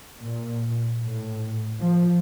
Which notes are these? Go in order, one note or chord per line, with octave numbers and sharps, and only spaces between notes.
A#2
A2
F3